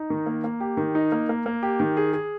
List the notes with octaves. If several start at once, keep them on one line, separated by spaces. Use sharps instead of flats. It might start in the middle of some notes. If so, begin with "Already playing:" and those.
Already playing: D#4
D#3
A#3
A#3
G4
D#3
D#4
A#3
A#3
A#3
G4
D#3
G#4
G#4